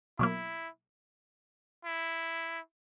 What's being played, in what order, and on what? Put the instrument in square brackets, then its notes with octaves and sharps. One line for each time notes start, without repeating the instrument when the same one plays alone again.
[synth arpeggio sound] B2 F#3 A#3 [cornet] E4
[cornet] E4